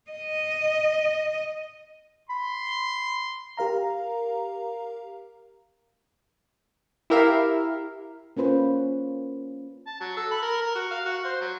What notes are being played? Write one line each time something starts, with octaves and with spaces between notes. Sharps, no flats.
D#5
B5 C6
G4 A#4 F5 A#5
E4 G4 A#4 E5 F5
A#3 C#4 F4 B4 C5
A5
F#3
A4
B5
A#4
A#4
F#4
F5
F#4
C5
F#3